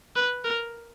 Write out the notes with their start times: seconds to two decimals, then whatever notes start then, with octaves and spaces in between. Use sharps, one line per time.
0.16 B4
0.44 A#4